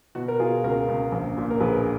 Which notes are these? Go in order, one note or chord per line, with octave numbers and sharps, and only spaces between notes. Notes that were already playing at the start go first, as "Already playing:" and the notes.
B2 F#4
A#4
B2 F4 G#4
C#2 F#4 A#4
C#2
A#1
A#2
A#4
A#1 G#4 B4